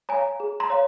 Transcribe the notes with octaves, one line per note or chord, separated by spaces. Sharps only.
C#5 F5 G#5 A#5
G#4
A#5 C6
C#5 F5